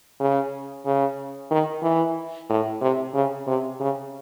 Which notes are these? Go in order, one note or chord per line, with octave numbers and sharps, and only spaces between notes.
C#3
C#3
D#3
E3
A2
C3
C#3
C3
C#3